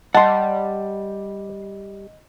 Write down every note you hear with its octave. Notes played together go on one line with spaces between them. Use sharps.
G3 D#5 F#5 A5 C6